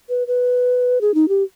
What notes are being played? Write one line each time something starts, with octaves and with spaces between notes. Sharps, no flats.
B4
B4
G#4
D#4
G4